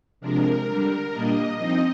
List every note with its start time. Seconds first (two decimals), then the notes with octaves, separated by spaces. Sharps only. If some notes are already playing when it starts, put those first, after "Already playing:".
0.21 C3 F3 G#3 D4 A#4
0.65 D3 G3 D4
1.11 A#2 G3 A#3 D4 D#5
1.57 F3 C4 D#4